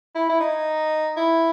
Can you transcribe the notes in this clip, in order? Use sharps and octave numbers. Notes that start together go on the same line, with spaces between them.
E4
E4
D#4
E4